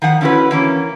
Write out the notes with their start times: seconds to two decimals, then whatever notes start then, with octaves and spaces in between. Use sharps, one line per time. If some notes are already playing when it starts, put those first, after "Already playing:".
0.02 D#3 F3 F#5 G#5
0.21 D3 C#4 E4 F#4 B4
0.51 E3 A#3 C#4